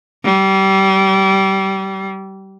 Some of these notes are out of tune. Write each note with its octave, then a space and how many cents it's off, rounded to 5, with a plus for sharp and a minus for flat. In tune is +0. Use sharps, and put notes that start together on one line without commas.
G3 -25